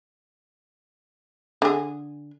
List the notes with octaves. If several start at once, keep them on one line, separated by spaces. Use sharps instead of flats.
D3 G#4